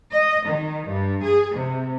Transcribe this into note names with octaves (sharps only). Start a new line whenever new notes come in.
D#5
D#3
G2
G#4
C3